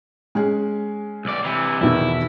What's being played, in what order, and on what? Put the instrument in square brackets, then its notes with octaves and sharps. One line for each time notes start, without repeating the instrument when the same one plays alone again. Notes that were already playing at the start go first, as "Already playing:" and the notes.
[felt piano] G#3 C#4 G#4
[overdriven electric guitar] B1 D5
C3 E3
[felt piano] E2 B2 D#3 [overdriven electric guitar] E4